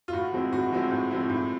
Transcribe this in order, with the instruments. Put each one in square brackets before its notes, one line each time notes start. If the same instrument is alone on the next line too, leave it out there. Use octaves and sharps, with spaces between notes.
[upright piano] F4
A2 F#4
F3 G#3 C4 E4
A2 F#4
F3 G#3 C4 E4
A2
F3 G#3 C4 E4
A2